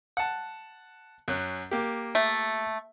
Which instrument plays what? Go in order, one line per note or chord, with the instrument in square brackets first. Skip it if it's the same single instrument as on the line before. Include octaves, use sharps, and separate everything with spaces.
[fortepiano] F#5 A5
F#2 C#4 F#6
A#3 G4
[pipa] A3